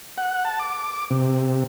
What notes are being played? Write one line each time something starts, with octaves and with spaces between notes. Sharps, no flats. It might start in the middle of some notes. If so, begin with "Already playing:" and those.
F#5
A5
D6
C3